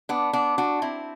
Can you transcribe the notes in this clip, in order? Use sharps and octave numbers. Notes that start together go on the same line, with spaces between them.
B3 D4
B3 D4
D4 F#4
C4 E4